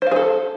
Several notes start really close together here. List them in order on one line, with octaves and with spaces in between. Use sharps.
C5 F5 G#4 A4